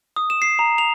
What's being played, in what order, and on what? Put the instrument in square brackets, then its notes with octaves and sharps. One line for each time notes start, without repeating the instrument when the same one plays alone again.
[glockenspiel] D#6
E7
C7
A#5
F7